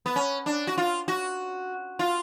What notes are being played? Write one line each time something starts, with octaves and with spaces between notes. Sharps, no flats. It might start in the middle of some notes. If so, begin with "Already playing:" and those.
B3
C#4
D4
F#4
F4
F#4
F4